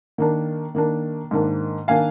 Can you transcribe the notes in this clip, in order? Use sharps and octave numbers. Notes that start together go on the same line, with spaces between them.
D#3 A#3 D4
D#3 A#3 D4
G#2 D#3 A#3 D4
D#3 A#3 D4 F5 G#5